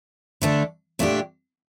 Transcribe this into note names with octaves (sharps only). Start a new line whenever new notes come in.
D3 A3 D4 A4
A#2 A3 D4 G4